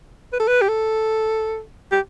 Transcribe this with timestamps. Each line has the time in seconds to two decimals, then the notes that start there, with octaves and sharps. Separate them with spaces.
0.33 B4
0.40 A4
0.48 B4
0.62 G4
0.69 A4
1.92 G4